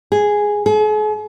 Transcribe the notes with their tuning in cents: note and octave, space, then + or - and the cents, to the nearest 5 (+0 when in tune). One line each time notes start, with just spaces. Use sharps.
G#4 +0
G#4 +45